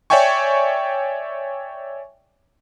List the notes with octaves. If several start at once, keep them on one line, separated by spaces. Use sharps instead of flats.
C#5 D5 E5 G5 G#5 C#6